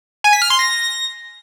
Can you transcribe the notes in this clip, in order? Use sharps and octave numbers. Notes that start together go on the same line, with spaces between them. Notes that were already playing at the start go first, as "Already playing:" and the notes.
G#5
B6
F6
C6
A#6